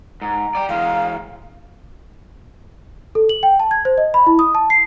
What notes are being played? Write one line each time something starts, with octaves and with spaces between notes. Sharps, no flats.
G#2 A#5
D5 G5
E3 G#3 F5
A4
F#7
G5
A5
G#6
C5
D#5
B5
E4
D#6
A5
C7